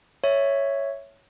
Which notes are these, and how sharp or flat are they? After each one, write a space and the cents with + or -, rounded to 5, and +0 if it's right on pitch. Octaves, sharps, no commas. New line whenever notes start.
C#5 +0 E5 +0